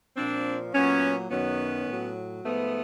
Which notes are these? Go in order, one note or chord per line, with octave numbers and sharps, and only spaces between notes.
A#2 F3 C4 D4
A#2 F#3 B3 C#4
F#2 D#3 F#3 B3 C#4
A2 F#3
G#2 F3 A3 B3